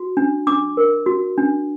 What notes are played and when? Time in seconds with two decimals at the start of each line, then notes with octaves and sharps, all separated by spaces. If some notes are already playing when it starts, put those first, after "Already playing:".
Already playing: F#4
0.17 D4
0.47 D4 D6
0.77 A#4
1.06 F#4
1.38 D4